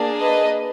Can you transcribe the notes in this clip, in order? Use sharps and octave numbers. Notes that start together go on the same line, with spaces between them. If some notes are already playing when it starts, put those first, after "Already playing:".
Already playing: A#3 D4 G#4
B4 D#5